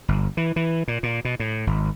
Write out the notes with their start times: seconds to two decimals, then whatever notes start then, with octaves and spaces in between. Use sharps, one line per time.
0.08 G1
0.37 E3
0.56 E3
0.88 A#2
1.03 A#2
1.25 B2
1.40 A2
1.67 G#1